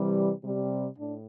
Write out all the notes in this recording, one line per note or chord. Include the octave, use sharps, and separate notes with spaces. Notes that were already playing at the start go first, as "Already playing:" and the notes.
Already playing: C3 E3 G3
C3 G3
A2 D4